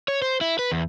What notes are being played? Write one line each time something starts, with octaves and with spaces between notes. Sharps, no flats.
C#5
C5
E4
B4
E2